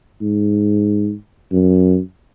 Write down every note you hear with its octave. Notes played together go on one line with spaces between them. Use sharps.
G#2
F#2